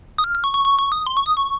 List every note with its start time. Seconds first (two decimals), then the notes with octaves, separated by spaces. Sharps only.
0.18 D#6
0.24 F6
0.35 F6
0.44 C#6
0.54 C#6
0.65 C#6
0.79 C#6
0.92 D#6
1.07 C6
1.17 C#6
1.26 D#6
1.37 C#6